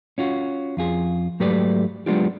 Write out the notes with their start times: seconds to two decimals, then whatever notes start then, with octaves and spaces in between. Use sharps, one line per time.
0.18 C#4 F4 F#4
0.77 F2 F4 G#4
1.40 G#2 F#3 A3 G4 B4 D5
2.06 F#3 G#3 B3 D4 F4 G4